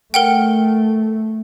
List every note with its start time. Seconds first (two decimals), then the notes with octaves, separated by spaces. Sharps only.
0.14 A3 A#4 F#5 G5